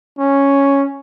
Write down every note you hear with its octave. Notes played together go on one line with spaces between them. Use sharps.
C#4